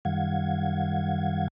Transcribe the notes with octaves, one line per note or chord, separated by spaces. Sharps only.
F#2 D#3 G3 F5 F#5 G#6